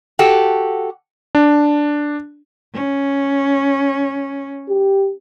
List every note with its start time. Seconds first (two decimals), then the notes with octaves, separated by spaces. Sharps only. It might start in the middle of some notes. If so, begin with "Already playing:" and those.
0.19 F#4 G4 A4
1.35 D4
2.74 C#4
4.69 G4